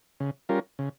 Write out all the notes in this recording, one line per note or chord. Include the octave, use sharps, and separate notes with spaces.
C#3
G3 C#4 F4 A#4
C#3